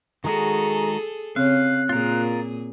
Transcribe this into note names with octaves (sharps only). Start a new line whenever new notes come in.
D#3 G#3 F#4 G#4 A4 A#5
C#3 C4 C#5 F5 F#6
A#2 F4 G#4 A#4